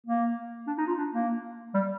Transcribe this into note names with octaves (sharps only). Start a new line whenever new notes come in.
A#3
D4
D#4
F4
D4
A#3
G3